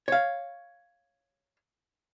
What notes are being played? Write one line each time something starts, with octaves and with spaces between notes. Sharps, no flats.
C#5 F5